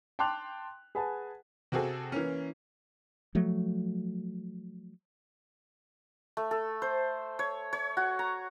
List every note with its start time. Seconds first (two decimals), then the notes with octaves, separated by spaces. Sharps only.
0.19 G5 A5 C6 D6 F#6 F7
0.95 G#4 B4 F#5 G#5 A5
1.72 C3 C4 F#4 G#4 A4
2.12 E3 A#3 C#4
3.35 F3 F#3 A3
6.37 A3
6.51 A4
6.82 C5
7.39 C#5
7.73 C#5
7.97 F#4
8.19 A#5